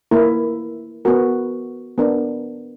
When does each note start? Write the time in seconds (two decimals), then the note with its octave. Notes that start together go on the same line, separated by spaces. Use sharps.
0.11 A#3 E4 A#4
1.05 B3 F#4 A#4
1.98 B3 D4 A#4